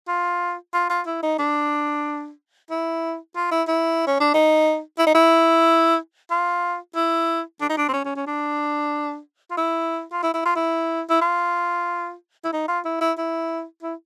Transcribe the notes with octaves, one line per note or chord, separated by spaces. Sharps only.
F4
F4
F4
E4
D#4
D4
E4
F4
E4
E4
C#4
D4
D#4
E4
D#4
E4
F4
E4
D4
D#4
D4
C4
C#4
C#4
C#4
D4
F4
E4
F4
E4
E4
F4
E4
E4
F4
E4
D#4
F4
E4
E4
E4
E4